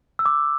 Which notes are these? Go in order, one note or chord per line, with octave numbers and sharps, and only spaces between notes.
E6
D6